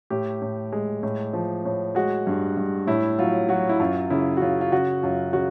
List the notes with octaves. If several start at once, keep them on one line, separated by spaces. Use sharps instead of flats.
A2 G4
A2
G#3
A2
F3
A2
G#3 F#4
G2
G2
A2 E4
F#3 F4
F#3 F#4
E4
F#2 F4
C#3 E4
F#4
C#3 F4
F4
C#3 F#4
F#2 F4
C#3 F#4